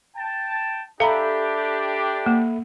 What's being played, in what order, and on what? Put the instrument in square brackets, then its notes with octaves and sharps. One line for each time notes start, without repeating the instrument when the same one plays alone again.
[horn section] G5 A5
[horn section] D4 G4 [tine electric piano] A4 E5 B5 [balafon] F5 A#5
[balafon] A#3